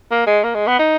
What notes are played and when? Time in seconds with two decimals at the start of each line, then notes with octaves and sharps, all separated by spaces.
0.11 A#3
0.26 G#3
0.43 A#3
0.54 G#3
0.67 B3
0.79 D#4